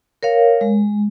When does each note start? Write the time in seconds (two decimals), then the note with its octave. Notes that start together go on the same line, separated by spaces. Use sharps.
0.23 A#4 C#5 F5
0.61 G#3